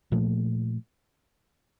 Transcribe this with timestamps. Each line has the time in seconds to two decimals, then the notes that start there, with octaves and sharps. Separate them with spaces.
0.12 A#2 F3 A3